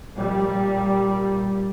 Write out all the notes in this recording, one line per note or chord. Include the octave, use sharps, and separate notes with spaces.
A#2 G3